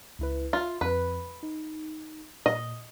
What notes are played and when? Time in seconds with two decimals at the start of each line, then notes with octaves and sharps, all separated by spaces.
0.19 C#2 E4 B4
0.53 F4 E5
0.81 F2 B4
1.43 D#4
2.46 A#2 D#5